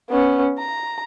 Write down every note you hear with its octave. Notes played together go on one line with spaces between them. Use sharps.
B3 C#4
A#5